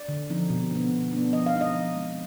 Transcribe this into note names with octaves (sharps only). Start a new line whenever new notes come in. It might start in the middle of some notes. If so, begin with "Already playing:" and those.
Already playing: D5
D3
F3 C4 D#4
B2
B3 D4
B2
B3 D4
F3 D#5
F5
G#3 C4 D#4
D#5
F3
G#3 C4 D#4